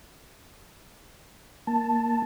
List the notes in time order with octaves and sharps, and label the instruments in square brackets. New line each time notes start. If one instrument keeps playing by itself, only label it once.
[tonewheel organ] A#3 A5